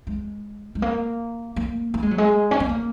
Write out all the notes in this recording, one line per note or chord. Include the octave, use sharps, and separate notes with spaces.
G#3
G#3
A#3
A#3
A#3
G#3
F#3
G#3
C#4
B3
A#3